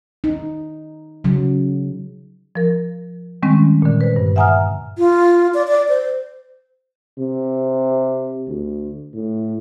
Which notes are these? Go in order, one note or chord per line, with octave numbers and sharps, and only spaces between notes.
D#4
C#3 F#3
F3 A#4
D#3 G3 G#3 C4 C#4
A#2 D3
B4 C5
G2
E5 F#5 G#5 A#5 D#6 F6
F4
D5
D5
C5
C3
D2
A2